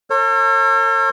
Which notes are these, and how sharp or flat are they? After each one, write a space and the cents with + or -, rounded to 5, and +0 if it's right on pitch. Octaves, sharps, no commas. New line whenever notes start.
A4 +45 C#5 -35